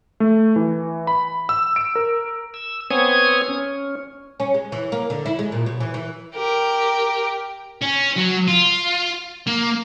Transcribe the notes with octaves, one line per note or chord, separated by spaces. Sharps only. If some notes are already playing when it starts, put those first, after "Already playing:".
A3
E3
B5
E6
D7
A#4
E6
B3 C4 C#5 G#5 D#6 G#6
C#4
C#4
G#3
E3
A#3
D3
E4
G#3
A#2
B2
E3
E3
G4 A#4
C#4
F#3
F4
A#3